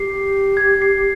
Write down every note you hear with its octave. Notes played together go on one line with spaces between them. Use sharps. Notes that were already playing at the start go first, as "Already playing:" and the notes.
Already playing: G4 C7
G#6
C7